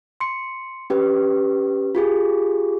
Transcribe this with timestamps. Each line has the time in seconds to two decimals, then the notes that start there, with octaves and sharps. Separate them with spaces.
0.20 C6 C#7
0.90 C#4 G4 B4
1.95 F4 G4 G#4